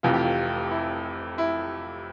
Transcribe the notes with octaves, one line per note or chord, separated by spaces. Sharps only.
F1 F2 C3 E3 F4
G4
F4
E4
E4